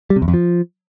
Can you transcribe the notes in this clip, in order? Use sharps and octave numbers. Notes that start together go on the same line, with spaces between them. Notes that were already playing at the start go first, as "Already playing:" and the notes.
G3
C3
E2
F2
F3